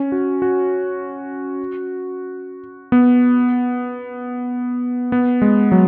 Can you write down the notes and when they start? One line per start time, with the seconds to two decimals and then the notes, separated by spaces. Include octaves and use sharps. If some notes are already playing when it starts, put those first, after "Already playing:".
Already playing: C#4
0.12 F#4
0.42 F#4
2.92 B3
5.12 B3
5.42 G#3
5.72 F#3